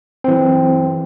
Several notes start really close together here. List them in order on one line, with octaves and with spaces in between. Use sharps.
C4 E3 F#3